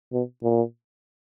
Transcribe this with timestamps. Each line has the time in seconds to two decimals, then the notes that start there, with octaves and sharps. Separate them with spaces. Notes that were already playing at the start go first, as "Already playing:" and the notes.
0.13 B2
0.43 A#2